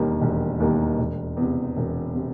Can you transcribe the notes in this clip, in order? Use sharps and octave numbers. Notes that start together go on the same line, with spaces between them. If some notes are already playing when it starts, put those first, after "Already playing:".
Already playing: E1 D#2 D#3 G3 A#3
E1
D#2 D#3 G3 A#3
E1
E2
C3
E1
C3